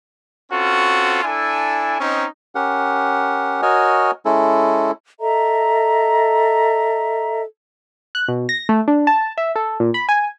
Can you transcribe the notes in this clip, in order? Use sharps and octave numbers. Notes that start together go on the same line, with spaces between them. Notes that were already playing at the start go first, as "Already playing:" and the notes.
C4 C#4 F4 F#4 A4
D4 E4 A4 G#5
C4 C#4 D#4
C#4 G4 A#4 F#5
F#4 A#4 C#5 D#5 G#5
G#3 C#4 E4 A4
A4 D#5 E5 A#5
F#6
B2
A#6
A3
D4
A5
E5
A4
A#2
B5
G#5